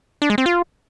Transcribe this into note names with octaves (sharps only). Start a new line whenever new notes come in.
D4
G#3
C4
F4